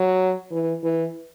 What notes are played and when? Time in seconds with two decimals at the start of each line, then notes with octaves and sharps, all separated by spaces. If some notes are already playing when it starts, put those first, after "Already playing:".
Already playing: F#3
0.51 E3
0.83 E3